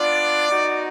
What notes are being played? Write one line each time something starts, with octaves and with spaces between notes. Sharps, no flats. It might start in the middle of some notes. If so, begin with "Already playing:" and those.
Already playing: B3 D4 F4 D5
B3 D#4 F#4